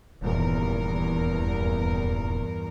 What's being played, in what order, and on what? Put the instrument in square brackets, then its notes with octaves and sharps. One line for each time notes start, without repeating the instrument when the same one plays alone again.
[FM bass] D#1 [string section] E2 G2 A#4